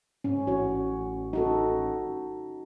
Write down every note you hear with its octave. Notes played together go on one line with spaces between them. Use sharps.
G#2 C#4
A1 F#4 C#5
D#4 F#4 A4